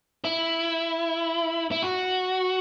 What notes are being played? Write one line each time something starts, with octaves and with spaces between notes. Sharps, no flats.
E4
E4
F#4